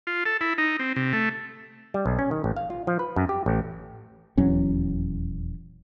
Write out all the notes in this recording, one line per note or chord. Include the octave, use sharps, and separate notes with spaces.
F4
A4
E4
D#4
C4
C3
A3
G3
B1
C#4
D#3
A1
F5
F4
F3
B4
F#2
G4
A1
D#1 E2 F#3 C#4